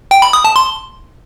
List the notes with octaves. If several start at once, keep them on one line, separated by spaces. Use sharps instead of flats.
G5
B5
D#6
A5
C6